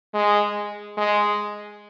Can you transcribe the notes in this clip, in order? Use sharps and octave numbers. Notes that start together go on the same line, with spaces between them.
G#3
G#3